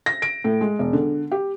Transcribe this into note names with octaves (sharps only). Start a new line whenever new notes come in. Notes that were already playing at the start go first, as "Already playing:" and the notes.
A#6
D7
A2
G#3
E1
D3
G4